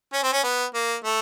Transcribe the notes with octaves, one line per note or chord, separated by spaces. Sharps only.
C#4
C4
C#4
B3
A#3
A3